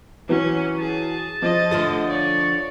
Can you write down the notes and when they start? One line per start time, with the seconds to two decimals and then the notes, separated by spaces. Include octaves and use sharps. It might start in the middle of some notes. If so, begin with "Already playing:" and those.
0.29 E3 F#3 C#4
0.79 G#4 A5
1.42 F3 D#5
1.71 D3 F3 A3 A6
2.09 C#5 D5